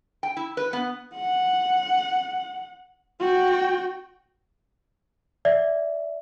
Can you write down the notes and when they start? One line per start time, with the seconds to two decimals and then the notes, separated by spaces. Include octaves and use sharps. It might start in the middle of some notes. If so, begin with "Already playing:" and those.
0.23 G5
0.37 E4
0.57 B4
0.73 B3
1.15 F#5
3.20 F#4 G5
5.45 D5 E5